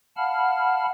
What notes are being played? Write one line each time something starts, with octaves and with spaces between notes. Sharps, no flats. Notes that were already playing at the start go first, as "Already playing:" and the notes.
F5 F#5 A5 B5 F6